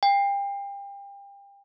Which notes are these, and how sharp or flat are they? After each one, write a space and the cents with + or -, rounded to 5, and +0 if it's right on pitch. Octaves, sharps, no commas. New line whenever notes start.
G5 +30